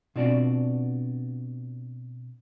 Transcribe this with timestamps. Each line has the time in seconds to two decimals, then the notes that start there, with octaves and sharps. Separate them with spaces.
0.16 B2 C4 D4 F4 F#4 D5